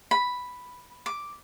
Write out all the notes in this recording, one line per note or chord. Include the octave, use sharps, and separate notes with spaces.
B5
D6